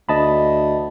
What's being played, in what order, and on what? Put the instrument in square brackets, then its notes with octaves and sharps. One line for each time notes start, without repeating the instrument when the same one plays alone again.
[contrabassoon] D2 [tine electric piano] D#5 A5 B5